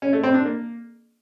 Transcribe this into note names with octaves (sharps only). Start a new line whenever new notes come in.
C#4
A3
C4
D4
A#3